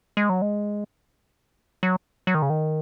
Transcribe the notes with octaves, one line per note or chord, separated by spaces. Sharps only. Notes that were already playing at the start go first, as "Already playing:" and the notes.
G#3
F#3
G#3
F#3
F#3
D#3
C#3
D#3